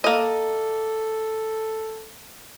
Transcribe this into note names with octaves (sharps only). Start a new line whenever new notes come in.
A#3 A4 D#5